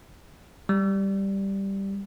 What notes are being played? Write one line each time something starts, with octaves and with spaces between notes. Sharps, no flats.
G3